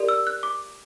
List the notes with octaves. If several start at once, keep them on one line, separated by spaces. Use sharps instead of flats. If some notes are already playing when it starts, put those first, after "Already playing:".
Already playing: G4 A#4 D5
E6
F#6
D6